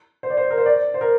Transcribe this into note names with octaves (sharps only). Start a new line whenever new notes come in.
C5
D5
C5
A#4
C5
D5
C5
A#4